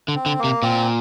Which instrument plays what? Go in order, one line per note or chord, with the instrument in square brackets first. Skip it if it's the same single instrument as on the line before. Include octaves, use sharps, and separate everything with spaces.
[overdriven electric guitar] D3
[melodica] C4
[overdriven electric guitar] D3
[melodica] A#3
[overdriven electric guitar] C3
[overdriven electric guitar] A#2 [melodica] C4